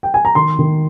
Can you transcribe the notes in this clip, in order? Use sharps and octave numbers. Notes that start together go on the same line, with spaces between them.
G5
G#5
A#5
D#3 C6
D#3